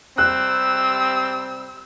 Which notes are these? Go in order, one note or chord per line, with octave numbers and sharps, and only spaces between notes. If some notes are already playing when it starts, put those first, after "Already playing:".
C3 G3 C4 E6 F#6